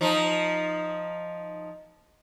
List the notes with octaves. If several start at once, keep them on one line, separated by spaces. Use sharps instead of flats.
F3 D#4